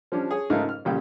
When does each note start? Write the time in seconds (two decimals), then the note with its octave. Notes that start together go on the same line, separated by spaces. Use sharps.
0.12 F3 G3 C#4 D4
0.31 G#4 C#5
0.50 G#2 C#3 A3 D#4 A#4 F5
0.69 F6
0.85 A1 A#2 C#3 G3 C#4 G5